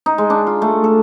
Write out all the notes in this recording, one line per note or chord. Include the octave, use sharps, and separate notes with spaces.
D#4
G#3
D4
F4
A3
A4